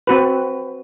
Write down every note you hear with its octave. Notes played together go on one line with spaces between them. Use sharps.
C4 F#4 B4